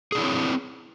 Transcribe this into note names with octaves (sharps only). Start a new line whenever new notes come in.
C4 D4 E4 G#4 C#5